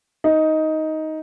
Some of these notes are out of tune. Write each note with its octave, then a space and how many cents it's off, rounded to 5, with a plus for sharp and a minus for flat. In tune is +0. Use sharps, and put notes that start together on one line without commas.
D#4 +10